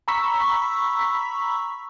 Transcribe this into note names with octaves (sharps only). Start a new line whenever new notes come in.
A#5 B5 C#6 E6 B6